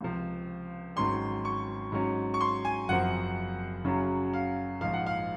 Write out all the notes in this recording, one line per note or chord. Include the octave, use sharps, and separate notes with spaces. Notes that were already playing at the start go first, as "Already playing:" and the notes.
C#2 C3 F3
G#1 G#2 F#3 C#4 C6
C#6
G#2 F#3 C#4
C#6
C6
G#5
F#1 F#2 F3 C4 F#5
F#2 C#3 F#3 C#4
F5
A#1 G#2 F3 F5
F#5
F5